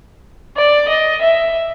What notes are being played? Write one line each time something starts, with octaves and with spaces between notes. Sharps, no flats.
D5
D#5
E5